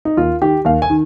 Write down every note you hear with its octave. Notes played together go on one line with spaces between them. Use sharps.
D#4
D#2 F4
D#3 G4
D#2 F5
G#5
D#3